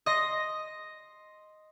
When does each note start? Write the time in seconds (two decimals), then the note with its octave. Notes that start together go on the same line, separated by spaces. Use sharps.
0.06 D#5 C6 A#6